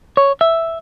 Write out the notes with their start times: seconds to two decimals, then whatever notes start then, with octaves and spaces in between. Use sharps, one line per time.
0.17 C#5
0.41 E5